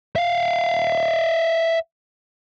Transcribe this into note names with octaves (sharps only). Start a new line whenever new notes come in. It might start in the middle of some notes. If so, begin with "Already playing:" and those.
E5 F5